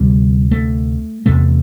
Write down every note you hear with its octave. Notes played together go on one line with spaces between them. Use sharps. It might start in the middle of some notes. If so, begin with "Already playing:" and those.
Already playing: D2 C3 G3
A3
E2 C3 A3